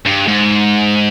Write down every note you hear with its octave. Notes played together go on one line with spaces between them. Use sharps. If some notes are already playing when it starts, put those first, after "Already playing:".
G2
G#2